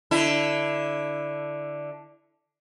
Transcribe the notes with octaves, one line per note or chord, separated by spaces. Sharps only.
D3 E4